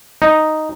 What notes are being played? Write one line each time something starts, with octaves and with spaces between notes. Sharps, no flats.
D#4